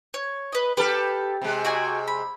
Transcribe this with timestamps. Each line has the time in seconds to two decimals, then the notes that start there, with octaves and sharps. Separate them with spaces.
0.14 C#5
0.52 B4 D#5
0.77 G4 A4 B4 F6
1.42 C3 G#3
1.65 F#4 D5 G#5
2.08 B5